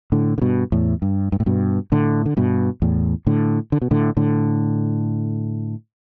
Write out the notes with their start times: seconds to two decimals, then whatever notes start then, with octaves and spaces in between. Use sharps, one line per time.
0.12 A2 D3
0.38 D3
0.42 G2 B2
0.72 E2 A2
1.02 G2
1.32 G2
1.40 A2
1.46 G2 B2
1.92 A2 D3
2.26 D3
2.37 G2 B2
2.82 E2 A2
3.27 A2 D3
3.72 D3
3.82 B2
3.91 A2 D3
4.17 A2 D3